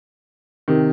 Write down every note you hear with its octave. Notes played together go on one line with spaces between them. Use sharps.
C3 D#3